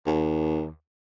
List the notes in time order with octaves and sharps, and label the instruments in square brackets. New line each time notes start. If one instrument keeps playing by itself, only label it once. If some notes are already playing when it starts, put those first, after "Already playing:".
[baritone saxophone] D#2